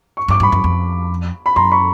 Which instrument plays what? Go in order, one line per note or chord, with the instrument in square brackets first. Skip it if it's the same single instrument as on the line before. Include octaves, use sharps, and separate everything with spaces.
[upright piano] C#6
[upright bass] G2 [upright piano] D6
[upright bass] G2 [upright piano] B5 C#6
[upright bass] F#2
F2
[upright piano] B5
[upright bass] F#2 [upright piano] A#5 C6
[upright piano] B5 C#6